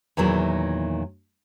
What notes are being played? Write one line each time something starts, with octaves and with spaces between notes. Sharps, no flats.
E2 A#2 D#3 F#3 E4